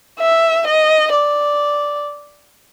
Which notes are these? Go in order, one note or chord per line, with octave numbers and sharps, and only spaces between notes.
E5
D#5
D5